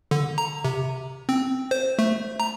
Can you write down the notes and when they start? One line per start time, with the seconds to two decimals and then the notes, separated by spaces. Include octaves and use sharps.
0.11 D3
0.38 A#5
0.65 C3
1.29 C4
1.71 C5
1.99 A3
2.40 A#5